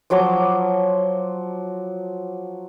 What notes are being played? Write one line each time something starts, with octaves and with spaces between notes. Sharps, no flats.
F3 F#3 C6 D6